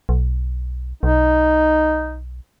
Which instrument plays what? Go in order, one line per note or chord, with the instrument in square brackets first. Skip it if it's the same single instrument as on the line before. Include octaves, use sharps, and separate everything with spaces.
[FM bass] B1
[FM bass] B1 [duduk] D#4